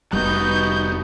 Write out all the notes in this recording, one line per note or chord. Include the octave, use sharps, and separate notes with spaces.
F1 G3 B3 D#4 F#4 G6